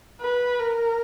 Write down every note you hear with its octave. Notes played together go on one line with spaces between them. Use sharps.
B4
A#4